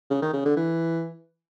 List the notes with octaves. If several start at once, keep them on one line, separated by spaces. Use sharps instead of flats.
C#3
D#3
C#3
D3
E3